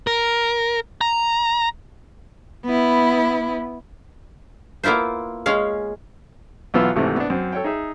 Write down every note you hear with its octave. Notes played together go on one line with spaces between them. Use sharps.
A#4
A#5
B3 E4
A#3 B3 E4 F4 C5
G#3 C#4 F5
B1 E3 B3 F4 B4 E6
G#1 G#2 C3 E3 A3
B3 D4
F#2 C4
A4 C#5 G5
D#4 G#4 E5